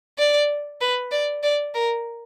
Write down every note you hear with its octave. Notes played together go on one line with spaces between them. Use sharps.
D5
B4
D5
D5
A#4